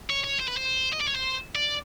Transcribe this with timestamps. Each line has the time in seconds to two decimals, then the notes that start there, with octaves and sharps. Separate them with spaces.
0.10 C#5
0.24 C#5
0.40 C5
0.48 B4
0.57 C5
0.93 D#5
1.00 D5
1.08 C#5
1.15 C5
1.55 D5